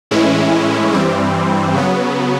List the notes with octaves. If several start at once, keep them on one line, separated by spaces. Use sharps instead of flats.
A2 E3 G#3 C#4 E4
G2 E3 G3 C4
C#3 F#3 B3